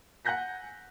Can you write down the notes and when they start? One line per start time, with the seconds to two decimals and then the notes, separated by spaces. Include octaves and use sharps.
0.25 F#5 G#5 F#6 G6 A#6 B6